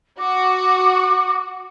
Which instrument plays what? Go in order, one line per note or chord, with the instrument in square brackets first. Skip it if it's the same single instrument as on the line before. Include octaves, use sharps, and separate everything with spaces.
[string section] F#4 [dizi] D6